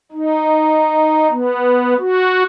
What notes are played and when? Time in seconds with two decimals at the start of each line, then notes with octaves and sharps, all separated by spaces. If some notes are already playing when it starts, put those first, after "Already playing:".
0.12 D#4
1.30 B3
1.99 F#4